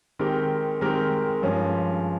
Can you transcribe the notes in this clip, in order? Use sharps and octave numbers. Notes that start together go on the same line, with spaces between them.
D#3 G#3 C4 G4 A#4
D#3 G#3 C4 G4 A#4
G2 F3 G#3 C#4